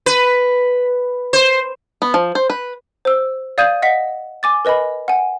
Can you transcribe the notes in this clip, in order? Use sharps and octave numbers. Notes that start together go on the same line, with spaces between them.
B4
C5
B3
F3
C5
B4
C5 E6
D5 F5 D#6 G6 G#6 D#7
D#5 F#5 B6
G#5 D6 A6
A#4 B4 D#5 G#5 B5
F#5 G#5